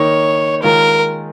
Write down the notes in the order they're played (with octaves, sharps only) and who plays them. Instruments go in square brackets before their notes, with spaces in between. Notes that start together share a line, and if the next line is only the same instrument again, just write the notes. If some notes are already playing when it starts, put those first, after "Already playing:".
Already playing: [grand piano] D#3 A#3 D#4 [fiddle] C#5
[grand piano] D#3 G#3 F4 G#4 C#5 [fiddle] A#4